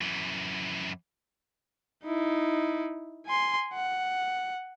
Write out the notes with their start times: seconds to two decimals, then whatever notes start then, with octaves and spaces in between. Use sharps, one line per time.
0.01 F#2 E3
2.05 D#4 E4
3.26 G#5 C6
3.74 F#5